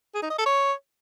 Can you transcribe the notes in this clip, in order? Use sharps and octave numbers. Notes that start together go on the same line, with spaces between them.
G#4
D#4
D#5
A4
C#5